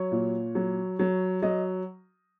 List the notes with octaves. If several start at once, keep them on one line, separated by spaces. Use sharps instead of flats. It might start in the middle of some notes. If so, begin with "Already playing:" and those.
Already playing: F#3 C#5
A#2
F#3
F#3
F#3 D#5